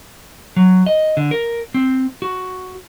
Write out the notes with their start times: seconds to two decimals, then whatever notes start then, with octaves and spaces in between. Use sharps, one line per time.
0.56 F#3
0.86 D#5
1.17 D3
1.31 A#4
1.74 C4
2.22 F#4